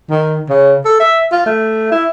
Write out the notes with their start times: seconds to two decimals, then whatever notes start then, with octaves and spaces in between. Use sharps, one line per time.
0.10 D#3
0.49 C#3
0.85 A4
1.00 E5
1.32 F4
1.46 A3
1.91 E4